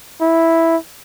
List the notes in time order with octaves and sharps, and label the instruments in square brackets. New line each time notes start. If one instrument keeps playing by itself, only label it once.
[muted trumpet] E4